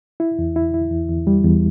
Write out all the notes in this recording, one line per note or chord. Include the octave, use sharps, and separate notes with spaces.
E4
E2
E4
E4
E2
E2
G3
E2